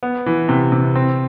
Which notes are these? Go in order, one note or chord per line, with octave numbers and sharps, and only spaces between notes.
B3
E3
C3
C3
C4